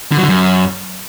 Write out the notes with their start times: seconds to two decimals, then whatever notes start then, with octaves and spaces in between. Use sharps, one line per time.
0.12 D3
0.17 F#3
0.23 D3
0.29 F#2